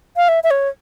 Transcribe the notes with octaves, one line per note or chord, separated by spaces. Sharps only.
F5
E5
E5
C#5